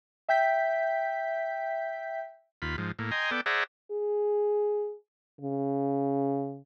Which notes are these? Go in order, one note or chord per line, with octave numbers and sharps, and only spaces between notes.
E5 G5 G6 B6
D#2 F4 B5
G#2 F3
A2 A#3
D#5 G5 G#5 A#5 C6
B3 A4 D5 G5
G#4 C5 D5 E5 F#5 A#5
G#4
C#3